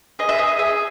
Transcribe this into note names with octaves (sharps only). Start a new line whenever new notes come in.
G#4 D#5
E5
G#4 D#5
G#4 E5